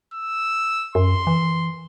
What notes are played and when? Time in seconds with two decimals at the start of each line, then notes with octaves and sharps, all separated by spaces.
0.14 E6
0.95 F#2 C6
1.27 E3